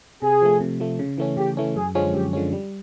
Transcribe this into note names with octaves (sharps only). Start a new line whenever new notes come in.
C3 G#4
F3 A3
C3
F3 A3
C#3
E3 A3 C#4
C#3 G4
E3 A3 C#4
F#2 G#4
D3 F3 G#3 C#4
F#2 G4
D3 F3 G#3 C#4
G3